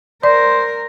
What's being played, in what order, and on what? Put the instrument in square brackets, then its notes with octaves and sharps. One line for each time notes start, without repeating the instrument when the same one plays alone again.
[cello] A#4 [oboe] C5 [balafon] D5